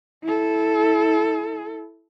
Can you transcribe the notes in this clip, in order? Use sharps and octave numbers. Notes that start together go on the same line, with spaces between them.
E4 A4